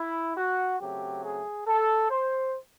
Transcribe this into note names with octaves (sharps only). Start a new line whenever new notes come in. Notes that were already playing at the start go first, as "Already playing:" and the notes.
Already playing: E4
F#4
C#3 F#3 A3 C4 G4
G#4
A4
C5